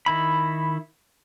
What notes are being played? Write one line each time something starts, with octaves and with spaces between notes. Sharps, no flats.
D#3 E4 B5